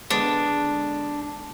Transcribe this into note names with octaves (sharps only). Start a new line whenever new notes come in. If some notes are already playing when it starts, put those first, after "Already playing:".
D3 G#3 B3 D4